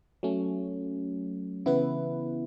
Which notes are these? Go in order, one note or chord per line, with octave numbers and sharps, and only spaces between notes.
F#3 A3 C#4
C#3 E3 B3 E4 B4